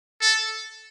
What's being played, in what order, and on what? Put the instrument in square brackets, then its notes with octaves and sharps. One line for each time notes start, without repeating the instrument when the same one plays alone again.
[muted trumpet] A4